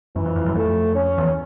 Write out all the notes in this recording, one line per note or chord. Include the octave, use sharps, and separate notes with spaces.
F#2 E3
F2
F2
F#2
F2 A3
C#4
E2